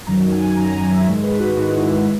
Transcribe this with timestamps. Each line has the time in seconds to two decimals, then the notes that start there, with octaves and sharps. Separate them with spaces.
0.07 F#2 D#3 F#3 A#5
0.32 G#5
0.57 F#2 D#3 F#3 A#5
0.73 G#5
0.90 E5
1.06 G#2 D#3 G#3 C#5
1.23 B4
1.39 F#4
1.56 G#2 D#3 G#3 F#4
1.69 E4
1.95 E4